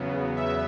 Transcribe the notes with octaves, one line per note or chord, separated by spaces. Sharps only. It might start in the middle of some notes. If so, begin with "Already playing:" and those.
Already playing: E2 C#3 F#3 B3
E5